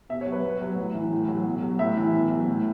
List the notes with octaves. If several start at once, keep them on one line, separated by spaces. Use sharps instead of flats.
B2 E5
C#5
F#3
B4
B2
F#3
A2
E3
A2
F#3
B2
F#3
A2 E5
E3
B2
F#3
A2